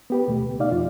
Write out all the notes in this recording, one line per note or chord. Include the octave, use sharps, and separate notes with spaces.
B3 G4 B4
D#2 B2 A3
C#2
B2 D#4 D5 F5
F2 F4